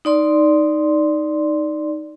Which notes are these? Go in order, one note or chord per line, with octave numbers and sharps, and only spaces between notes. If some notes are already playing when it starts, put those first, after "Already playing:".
D#4 D5 C6